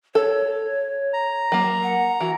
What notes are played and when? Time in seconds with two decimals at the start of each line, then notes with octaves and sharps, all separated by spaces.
0.15 A4 C#5
1.13 A#5
1.52 F#3 A#3
1.83 F#5
2.21 E3 F#4